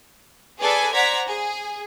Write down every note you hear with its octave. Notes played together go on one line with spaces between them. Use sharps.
G#4 A4 B4 D5 G#5
C5 D5 F#5 A#5 G#6 B6
G#4